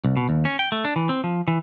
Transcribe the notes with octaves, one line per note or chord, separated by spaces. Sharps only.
C2
B2
D#2
C#4
G5
A3
D4
E3
C4
F3
E3